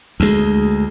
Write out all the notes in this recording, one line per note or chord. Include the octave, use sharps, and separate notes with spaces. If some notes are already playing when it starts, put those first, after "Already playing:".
D2 G#3